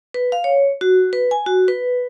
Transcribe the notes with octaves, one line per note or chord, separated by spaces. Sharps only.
B4
F5
C#5
F#4
B4
G#5
F#4
B4